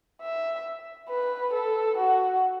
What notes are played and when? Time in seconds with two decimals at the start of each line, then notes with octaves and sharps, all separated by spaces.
0.21 E5
1.09 B4
1.53 A4
1.98 F#4